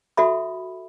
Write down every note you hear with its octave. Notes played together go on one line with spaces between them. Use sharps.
F#4 A4 E5 B5